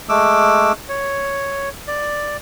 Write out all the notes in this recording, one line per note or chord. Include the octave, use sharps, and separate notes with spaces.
G#3 A3 D6 E6
C#5
D5